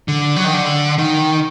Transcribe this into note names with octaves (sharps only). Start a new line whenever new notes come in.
D3
F#3
D#3
D3
D#3